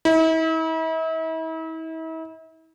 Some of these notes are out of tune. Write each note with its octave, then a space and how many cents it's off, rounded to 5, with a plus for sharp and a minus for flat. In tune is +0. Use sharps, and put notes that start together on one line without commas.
E4 -40